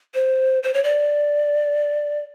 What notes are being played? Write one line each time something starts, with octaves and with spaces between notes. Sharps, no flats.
C5
C5
C#5
D5